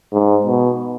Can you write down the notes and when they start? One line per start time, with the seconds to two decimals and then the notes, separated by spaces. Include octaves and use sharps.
0.13 G#2
0.46 B2